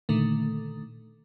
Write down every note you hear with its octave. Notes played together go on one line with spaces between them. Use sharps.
A#2 D3 D#3 A3